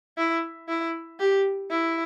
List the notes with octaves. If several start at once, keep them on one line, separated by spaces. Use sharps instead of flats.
E4
E4
G4
E4